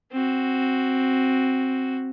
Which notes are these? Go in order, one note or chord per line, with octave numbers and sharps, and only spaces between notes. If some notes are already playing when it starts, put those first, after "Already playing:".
C4 F#4